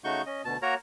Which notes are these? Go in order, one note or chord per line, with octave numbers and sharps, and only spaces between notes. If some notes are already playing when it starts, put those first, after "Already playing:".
C#3 A3 D#4 F#4 C#6 G6
C#4 D#5
D2 B2 A5
A#3 F#4 A#4 C#5 A#5